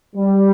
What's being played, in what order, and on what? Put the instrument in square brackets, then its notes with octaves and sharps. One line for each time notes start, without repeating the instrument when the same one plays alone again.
[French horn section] G3